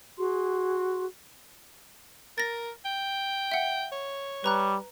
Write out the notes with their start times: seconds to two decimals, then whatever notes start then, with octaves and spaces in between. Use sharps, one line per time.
0.18 F#4 G#4 C6
2.38 A#4 A6 A#6
2.85 G5
3.52 E5 F#5
3.92 C#5
4.44 G3 B4 A#5 F#6